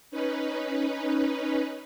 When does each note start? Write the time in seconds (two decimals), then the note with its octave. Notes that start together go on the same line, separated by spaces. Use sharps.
0.11 C#4 D#4 B4